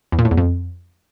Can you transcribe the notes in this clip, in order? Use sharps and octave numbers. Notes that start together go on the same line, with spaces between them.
E2
A#2
A2
E2
F2